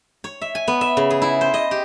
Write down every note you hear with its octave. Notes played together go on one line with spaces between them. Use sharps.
C#5
E5
G#5
B3
E5
C#3
G#4
E4
C5
D#5
G4